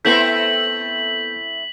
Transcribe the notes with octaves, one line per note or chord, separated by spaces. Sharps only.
A3 B3 C4 E4 A4 G6 B6 F#7